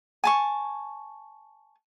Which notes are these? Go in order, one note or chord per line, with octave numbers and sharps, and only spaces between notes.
G#5 A5 C#6